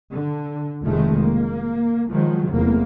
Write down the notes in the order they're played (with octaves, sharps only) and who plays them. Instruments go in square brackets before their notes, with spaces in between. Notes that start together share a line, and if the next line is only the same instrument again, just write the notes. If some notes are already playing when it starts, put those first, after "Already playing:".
[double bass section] D3
F1 D#3 G#3 A3
A#3
D#3 F3 F#3 G#3
F1 E2 A#3